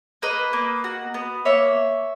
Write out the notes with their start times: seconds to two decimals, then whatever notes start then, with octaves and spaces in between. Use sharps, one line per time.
0.22 A#3 B4 D#5
0.53 A#3
0.84 F#4
1.14 B3
1.45 A#3 C#5 E5